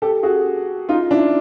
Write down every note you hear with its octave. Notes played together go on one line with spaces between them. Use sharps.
G4 A4
F#4 G#4
D#4 F4
D4 E4